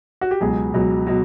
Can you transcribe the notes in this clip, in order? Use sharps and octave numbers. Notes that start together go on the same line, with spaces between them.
F#4
G4
C#2 B2 F#3 G#4
C#2 B2 F#3
B2 F#3